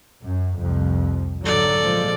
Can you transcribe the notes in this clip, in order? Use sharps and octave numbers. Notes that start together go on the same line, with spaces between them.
F#2
C2 F2 F3
G#2 D3 F#3 A4 D5
A#2 F3 G#3